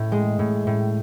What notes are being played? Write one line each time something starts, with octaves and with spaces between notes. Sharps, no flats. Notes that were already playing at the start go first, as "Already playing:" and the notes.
Already playing: A2
G#3
A2
A2